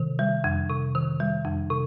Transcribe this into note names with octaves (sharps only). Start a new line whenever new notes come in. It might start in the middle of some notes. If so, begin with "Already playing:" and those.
Already playing: C3 D#3
G3
F2
C3
D#3
G3
F2
C3